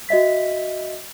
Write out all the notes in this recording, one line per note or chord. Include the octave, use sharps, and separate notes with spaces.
F#4 D#5 E5 B6